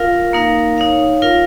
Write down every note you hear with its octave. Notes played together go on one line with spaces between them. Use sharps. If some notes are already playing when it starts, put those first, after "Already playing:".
Already playing: F4 A#4 F5
A#3 D#4 A#4 F5
D#4 C#5 F5
F4 A#4 F5